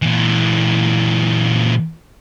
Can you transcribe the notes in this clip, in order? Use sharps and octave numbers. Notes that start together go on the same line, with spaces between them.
A#2 E3